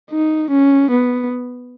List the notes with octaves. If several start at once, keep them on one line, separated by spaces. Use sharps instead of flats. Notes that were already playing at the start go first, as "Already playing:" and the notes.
D#4
C#4
B3